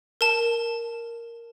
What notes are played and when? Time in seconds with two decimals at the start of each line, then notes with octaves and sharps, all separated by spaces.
0.21 A#4 A5